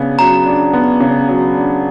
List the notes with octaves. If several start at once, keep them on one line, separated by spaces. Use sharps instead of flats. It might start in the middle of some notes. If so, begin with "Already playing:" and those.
Already playing: C#3 B3 D4
F#3 A#5
D4
B3
C#3
F#3
D4